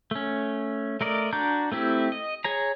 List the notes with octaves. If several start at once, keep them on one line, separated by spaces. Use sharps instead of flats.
A3 C#4
A3 A#4 D5 D#5
D4 F#4 A#5 D6 G6
A3 C4 E4 G4
D#5
G#4 C#5 A#5